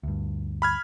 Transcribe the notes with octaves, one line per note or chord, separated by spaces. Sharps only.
D2 G2
B5 F6 G#6